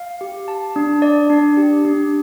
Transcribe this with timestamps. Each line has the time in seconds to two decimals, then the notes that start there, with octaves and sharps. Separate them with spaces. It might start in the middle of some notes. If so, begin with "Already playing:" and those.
Already playing: F5
0.21 G4
0.48 A5
0.76 D4
1.02 D5
1.30 D4
1.57 G4
1.85 D4